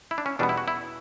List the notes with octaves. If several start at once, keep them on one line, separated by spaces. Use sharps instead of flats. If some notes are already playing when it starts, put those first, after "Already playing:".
E4
D4
C#4
E2 B2 G3 B3 D4
E4
F#4
E4